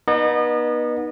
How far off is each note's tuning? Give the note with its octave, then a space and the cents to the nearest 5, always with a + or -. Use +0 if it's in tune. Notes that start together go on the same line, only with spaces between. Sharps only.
B3 -30 D#4 -15 D#5 -35